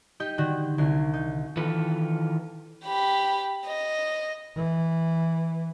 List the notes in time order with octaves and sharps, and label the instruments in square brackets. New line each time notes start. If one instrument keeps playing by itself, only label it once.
[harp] D#4 G4 D#5 G5
D3 D#3 F#4
C2 D3 C7
D#4
[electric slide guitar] D#3 E3 F4 A4 B4
[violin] G4 B5
D#5
[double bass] E3